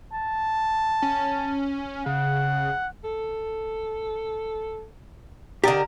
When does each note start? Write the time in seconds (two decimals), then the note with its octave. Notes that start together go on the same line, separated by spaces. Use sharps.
0.14 A5
1.02 C#4
2.06 C#3 F#5
3.04 A4
5.64 D3 G4 A#4 D5 D#5